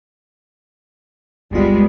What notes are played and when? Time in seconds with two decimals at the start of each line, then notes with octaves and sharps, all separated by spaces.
1.51 G1 D2 G3 G#3 B3 F4